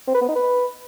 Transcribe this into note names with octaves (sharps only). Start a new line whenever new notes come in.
C4
B4
B3
D#4
B4